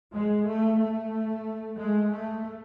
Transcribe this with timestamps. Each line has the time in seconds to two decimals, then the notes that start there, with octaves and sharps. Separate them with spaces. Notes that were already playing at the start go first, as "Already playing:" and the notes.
0.13 G#3
0.46 A3
0.79 A3
1.78 G#3
2.12 A3